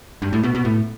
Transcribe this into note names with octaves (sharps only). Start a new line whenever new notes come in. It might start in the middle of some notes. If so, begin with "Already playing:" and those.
G2
A2
B2
B2
A2